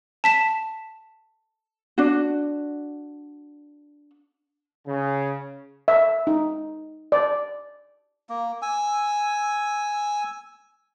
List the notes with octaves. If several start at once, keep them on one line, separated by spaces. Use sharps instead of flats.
A5 B6 E7
D4 F#4
C#3
E5
D#4
D5
A#3
G#5 E6